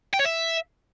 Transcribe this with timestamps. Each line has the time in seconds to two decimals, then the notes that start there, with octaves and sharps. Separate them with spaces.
0.13 G5
0.19 C#5
0.25 E5